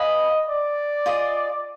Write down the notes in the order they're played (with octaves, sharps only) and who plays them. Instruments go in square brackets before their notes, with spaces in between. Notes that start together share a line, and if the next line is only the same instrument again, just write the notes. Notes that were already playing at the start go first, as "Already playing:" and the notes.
Already playing: [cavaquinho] B4 F5 G#5 B5 [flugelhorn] D#5
[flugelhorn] D5
[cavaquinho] F4 G#4 D#5